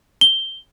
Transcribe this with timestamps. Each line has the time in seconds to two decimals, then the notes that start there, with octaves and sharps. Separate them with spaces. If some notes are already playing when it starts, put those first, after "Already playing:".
0.21 G7